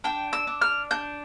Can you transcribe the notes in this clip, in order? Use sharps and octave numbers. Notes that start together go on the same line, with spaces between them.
D4 G5
E6
D4
F6
D4 G6